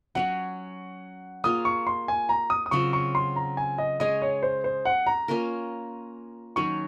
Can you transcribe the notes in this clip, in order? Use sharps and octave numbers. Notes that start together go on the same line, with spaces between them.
F#3 C#4 F#4 F#5
A#3 F4 G#4 C#5 D#6
C#6
C6
G#5
A#5
D#6
D#6
C#3 F#3 C4 F4 C#6
C#6
C6
A#5
G#5
D#5
G#3 C#4 G#4 D#5
C#5
C5
C5
F#5
A#5
A#3 C#4 F4 A#4
D#3 F#3 C#4 C#6